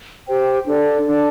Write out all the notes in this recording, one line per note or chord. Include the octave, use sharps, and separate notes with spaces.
G4 C5 G5
D4 A4 D5
D4 A4 D5